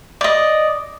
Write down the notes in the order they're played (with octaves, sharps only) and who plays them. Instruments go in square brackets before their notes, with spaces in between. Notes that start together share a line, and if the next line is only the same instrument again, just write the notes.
[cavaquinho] D5 D#5